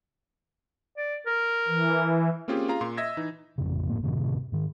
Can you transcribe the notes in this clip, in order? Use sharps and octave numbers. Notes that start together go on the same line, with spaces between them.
D5
A#4
E3
A#3 C4 C#4 F4 G4 G#4
F4 G#4 F5 A#5
A#2 C6
D#5 E5 E6 G#6 A#6
E3 D#4
A1 F2 C#3
F#1 A2 A#3
F#2 A2 C3 D#3
G#2 D#3